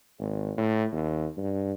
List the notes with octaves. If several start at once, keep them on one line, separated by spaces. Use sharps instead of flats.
G#1
A2
D#2
G2